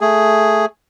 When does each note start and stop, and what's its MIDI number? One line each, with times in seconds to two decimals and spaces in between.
0.01 0.66 57
0.01 0.66 68